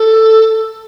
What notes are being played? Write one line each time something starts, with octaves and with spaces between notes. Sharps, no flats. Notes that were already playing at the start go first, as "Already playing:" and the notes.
Already playing: A4